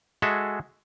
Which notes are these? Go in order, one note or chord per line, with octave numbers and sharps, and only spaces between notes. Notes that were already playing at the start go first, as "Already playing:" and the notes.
G#3 F#4 G#4 A4 E5